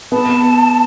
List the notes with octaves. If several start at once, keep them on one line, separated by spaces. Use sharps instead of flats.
B3 A5